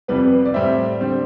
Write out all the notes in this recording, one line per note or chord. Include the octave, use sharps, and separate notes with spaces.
F2 C3 G3 B3 B4
D5
A2 G3 C4 E5
D3 G3 C4